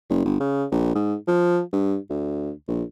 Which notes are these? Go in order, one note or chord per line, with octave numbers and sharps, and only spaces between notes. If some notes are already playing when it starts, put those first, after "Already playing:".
F#1
G1
C#3
A#1
G#2
F3
G2
D2
A#1